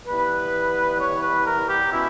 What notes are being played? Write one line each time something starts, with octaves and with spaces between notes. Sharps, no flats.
E3 G3 B3 B4
C#5
B4
A#4
G4
B2 G#3 C#4 E4